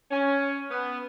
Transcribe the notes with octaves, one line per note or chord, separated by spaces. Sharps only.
C#4
B3